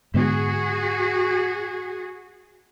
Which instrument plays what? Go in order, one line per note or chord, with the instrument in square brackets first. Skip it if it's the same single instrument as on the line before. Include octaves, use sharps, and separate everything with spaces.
[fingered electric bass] G#2 D3 B3 [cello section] F#4 G#4